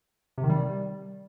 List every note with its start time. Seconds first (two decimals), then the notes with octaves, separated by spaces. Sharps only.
0.38 C3
0.44 D#3
0.50 G3